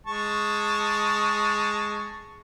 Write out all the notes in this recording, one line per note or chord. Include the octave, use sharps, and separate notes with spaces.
G#3 A5 C#6